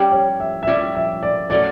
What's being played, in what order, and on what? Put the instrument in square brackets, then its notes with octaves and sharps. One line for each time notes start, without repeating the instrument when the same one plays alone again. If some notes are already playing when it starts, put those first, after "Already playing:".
Already playing: [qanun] G3 C#4 G4
[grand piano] C#5
E5
E5
[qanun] G3 C#4 G4 [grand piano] D5
[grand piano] E5
D5
[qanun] F#3 A3 C#4 [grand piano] D5